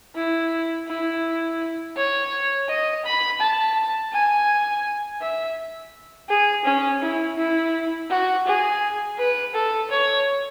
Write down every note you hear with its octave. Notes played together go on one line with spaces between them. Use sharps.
E4
E4
C#5
D#5
B5
A5
G#5
E5
G#4
C#4
E4
E4
F#4
G#4
B4
A4
C#5